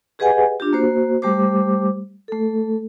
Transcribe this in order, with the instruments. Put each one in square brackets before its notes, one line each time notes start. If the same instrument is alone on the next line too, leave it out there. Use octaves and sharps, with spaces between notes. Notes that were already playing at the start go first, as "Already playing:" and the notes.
[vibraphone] G4 G#4 B4 D#5 F#5 G#5
D4 F4 G4
A#3 F#4 C5
G3 A3 G4 C5 D6
A3 A4